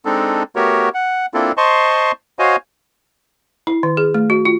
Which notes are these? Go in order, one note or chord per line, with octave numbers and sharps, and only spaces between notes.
G#3 C4 D4 D#4 A4
A3 B3 F#4 G4 A#4 C#5
F#5
A#3 C4 D4 E4 F4 A4
C5 D#5 A5 C6 C#6
F#4 C5 C#5 D#5 F5 G#5
E4
D#3
G#4
A3
F#4
F4